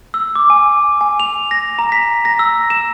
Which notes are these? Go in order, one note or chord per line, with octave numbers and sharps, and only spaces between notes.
E6
D6
G#5
G#5
F7
A#6
A#5
B6
A#6
E6
E7